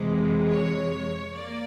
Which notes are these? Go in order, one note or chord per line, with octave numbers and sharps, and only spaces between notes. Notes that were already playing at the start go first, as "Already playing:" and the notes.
Already playing: F2 C3 E3 G#3
C#5
A#3 D5